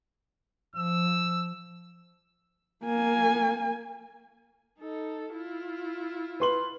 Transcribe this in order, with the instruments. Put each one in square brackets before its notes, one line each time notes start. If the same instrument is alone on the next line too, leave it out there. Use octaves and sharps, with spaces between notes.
[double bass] F3 [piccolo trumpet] E6
[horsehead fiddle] A#3 G#5
[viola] D#4 A4
E4 F4
[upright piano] B4 C6 F#7